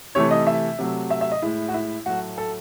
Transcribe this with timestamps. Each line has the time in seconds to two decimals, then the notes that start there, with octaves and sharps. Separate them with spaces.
0.15 C3 E3 A3 C#5
0.31 D#5
0.47 E5
0.79 C3 F#3 A3
1.10 E5
1.21 E5
1.31 D#5
1.42 A2 G#3 E4
1.68 F#4
1.74 E4
2.06 A2 F#3 A3 F#4
2.38 A4